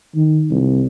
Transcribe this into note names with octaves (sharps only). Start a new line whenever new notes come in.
D#3
C2